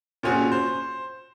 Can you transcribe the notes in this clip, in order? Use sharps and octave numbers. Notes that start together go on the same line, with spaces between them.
A#2 C4 C#4 F#4 G#4
C5